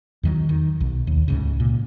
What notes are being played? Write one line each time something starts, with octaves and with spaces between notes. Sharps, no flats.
E2 D#3 F#3
D#3
B1
D#2
C#2 G#2 C#3
A#2